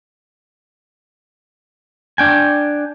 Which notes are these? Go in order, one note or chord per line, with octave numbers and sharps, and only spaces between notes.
D4 G5 G#5